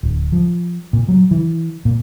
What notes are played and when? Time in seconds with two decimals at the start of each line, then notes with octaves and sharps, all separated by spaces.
0.03 D1
0.32 F3
0.93 A#2
1.09 F#3
1.31 E3
1.85 A#2